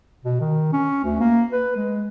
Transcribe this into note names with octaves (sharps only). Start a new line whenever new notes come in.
B2
D#3
C#4
D2
A#3
B4
G#3